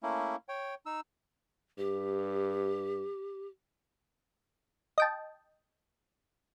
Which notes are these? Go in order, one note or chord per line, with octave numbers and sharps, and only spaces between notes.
A3 A#3 C#4 E4
C#5 G5
D#4 E6
G2 G4
D#5 G5 A5